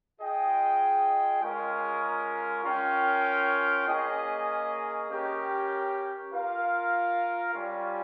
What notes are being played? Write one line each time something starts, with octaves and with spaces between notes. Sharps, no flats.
F4 G#4 D#5 G5
G#3 C#4 F4 A#4 D#5
C#4 F4 A#4 C#5 G5
A#3 C#4 G#4 D#5
C#4 G4 A#4 C#5 G5
F4 A#4 F5
G3 C#4 F4